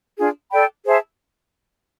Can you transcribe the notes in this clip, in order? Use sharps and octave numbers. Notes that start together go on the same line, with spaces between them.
D4 F4 G#4
A4 D5 G5 B5
G#4 C5 E5 A5